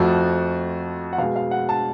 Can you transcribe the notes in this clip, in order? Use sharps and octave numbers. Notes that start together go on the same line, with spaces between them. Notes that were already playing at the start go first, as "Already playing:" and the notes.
Already playing: F2 F3 A3 F#4
F#5
B2 G#3 F5
F5
F#5
A5